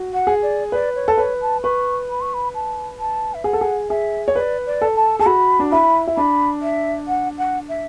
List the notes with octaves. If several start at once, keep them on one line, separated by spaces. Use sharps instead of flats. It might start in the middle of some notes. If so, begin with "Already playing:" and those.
Already playing: F#4
F#5
G#4
D5
B4 D5
C#5
A4
B4 C#5
A5
B4 C#6
B5
C#6
B5
A5
A5
E5
G#4 F#5
A4
G#4
G#4 E5
C#5
B4 D5
D5
A4
A5
G#4 A5
F#4 B5
D4
E4 B5
E4
D4 B5
E5
F#5
F#5
E5